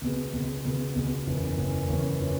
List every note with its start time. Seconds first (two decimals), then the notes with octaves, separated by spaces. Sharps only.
0.01 C#2 B2 B3 G#4
0.33 C#2 B2 B3 G#4
0.65 C#2 B2 B3 G#4
0.96 C#2 B2 B3 G#4
1.27 F#1 E2 E3 C#4
1.57 F#1 E2 E3 C#4
1.88 F#1 E2 E3 C#4
2.21 E3 C#4